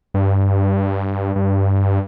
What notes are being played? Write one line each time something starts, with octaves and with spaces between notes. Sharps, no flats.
G2
G2